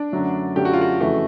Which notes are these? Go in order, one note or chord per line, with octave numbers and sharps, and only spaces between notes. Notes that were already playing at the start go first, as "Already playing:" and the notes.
Already playing: D4
F#2 D3 F#3 A3
F#2 D3 F#3 A3 G4
F#4
F4
F#4
F2 C#3 E3 A3